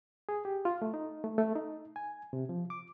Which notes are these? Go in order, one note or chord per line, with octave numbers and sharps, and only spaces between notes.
G#4
G4
F4
A3
D#4
A3
A3
D#4
G#5
C3
F3
D6